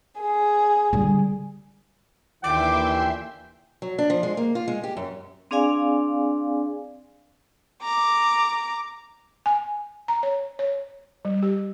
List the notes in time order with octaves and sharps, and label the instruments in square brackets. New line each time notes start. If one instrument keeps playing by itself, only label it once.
[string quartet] G#4
[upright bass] D3 G3
[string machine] D#2 E5 C6 [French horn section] A#2 D3 E3 [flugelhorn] G5 [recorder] D6
[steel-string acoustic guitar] F#3
D4
F3
G#3
A#3
F4
G#3
G4
F#2
[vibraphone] C4 D4 G#4 D5 F5 G#5
[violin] A#5 D6
[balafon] G#5
A#5
C#5
C#5
G3
G4